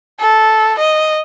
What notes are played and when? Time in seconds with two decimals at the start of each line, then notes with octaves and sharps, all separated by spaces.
0.20 A4
0.78 D#5